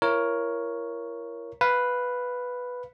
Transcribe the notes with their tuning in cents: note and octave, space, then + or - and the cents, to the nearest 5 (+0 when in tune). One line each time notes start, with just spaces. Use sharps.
E4 +45 A#4 +10 C#5 +0
B4 +0 F5 +0